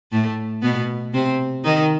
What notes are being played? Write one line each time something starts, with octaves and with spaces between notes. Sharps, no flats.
A2 A3
B2 B3
C3 C4
D#3 D#4